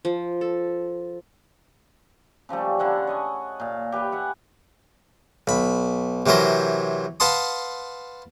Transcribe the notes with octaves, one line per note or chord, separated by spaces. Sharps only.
F3
A4
C#3 F3 G3 A3
D3 E4 F#5 A5
C#5 D#5 G#5
A#2 F5
G4 B4 E5 G5
E4 F#5 G#5
B1 B5
C3 E3 F#3 A#4 C5
B4 F5 F#5 A5 C6 D#6